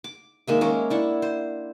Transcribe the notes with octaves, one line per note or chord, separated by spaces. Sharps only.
D6
D#3 G#3 A#3 E5
G#3 A#3 C#4
D4 E4 F#5
C5